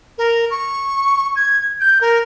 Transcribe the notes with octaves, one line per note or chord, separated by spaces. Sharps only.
A#4
C#6
G#6
G6
A#4